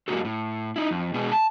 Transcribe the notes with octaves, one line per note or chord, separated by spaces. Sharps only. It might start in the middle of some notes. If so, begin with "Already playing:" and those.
F#2 C#3 G#3 A#3 F#4 A4
A2
D#4 E4
F2
B2 G#3 B3 G#4
A5